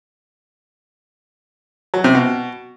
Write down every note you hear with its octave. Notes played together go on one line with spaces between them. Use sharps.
F#3
C3
B2